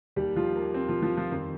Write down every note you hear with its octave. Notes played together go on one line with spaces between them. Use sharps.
D#2 D#3 G3 G4
F3 F4
A#3
C4
F3 F4
F3 F4
F3 F4
F2 D#3 G3 C4